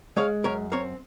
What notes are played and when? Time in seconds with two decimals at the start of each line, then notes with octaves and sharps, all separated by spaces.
0.17 G#3 C#5 F5
0.44 F#2 A#4 C#5
0.72 C4 A#4 C#5